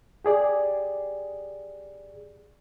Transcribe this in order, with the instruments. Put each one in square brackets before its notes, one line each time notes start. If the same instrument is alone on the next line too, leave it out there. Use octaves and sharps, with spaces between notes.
[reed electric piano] G4 G#4 D5